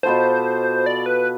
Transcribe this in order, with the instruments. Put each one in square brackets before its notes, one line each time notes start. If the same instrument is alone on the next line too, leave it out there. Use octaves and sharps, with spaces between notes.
[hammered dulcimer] B2 B3 F4 A4 [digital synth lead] C5
[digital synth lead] D5
B4